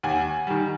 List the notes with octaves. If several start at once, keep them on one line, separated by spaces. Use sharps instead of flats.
D#2 F#5 G#5
D#3 G3